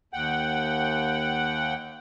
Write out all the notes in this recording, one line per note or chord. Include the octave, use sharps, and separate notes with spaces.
D#2 F#5 G5